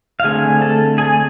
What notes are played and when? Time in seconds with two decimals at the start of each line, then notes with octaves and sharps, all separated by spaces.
0.20 F5
0.24 D3 A3 C4 G#4 G#5
0.62 A4 A5
0.98 G#4 G#5